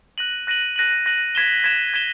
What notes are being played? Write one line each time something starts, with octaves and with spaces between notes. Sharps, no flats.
F#6 A#6 D#7 F#7
F#6 A#6 D#7 F#7
F#6 A#6 D#7 F#7
F#6 A#6 D#7 F#7
G#6 B6 E7 G7
G#6 B6 E7 G7
G#6 B6 E7 G7